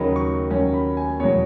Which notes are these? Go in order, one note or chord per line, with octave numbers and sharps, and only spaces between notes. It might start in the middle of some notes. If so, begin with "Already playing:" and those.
Already playing: D#2 C#3 F#3 A#3 D#4 B5
C#6
D#2 D#3 F#3 A#3 C#4
B5
G#5
E2 B2 F#3 C#5